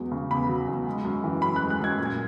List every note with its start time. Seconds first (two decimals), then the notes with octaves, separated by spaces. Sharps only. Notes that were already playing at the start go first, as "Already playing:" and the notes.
Already playing: E2 F#3 G#3
0.11 C#3
0.31 E2 B5
0.49 F#3
0.68 E2
0.87 G#3
1.05 F#2
1.24 E3
1.42 F#2 B5
1.56 G#3 F#6
1.70 F#6
1.80 F#2 G#6
1.99 A#2
2.06 G#6